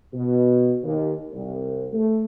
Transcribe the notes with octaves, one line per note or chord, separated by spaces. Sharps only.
B2
D#2
C2
A3